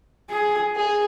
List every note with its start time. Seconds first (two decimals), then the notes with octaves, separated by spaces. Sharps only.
0.30 G#4
0.76 G#4